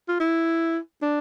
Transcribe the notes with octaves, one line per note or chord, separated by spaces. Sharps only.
F4
E4
D4